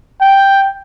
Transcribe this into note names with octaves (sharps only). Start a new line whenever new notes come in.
G5